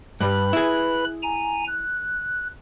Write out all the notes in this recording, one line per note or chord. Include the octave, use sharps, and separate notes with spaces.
G2 G3 B4 B5
E4 G#4
G#5 A#5
F#6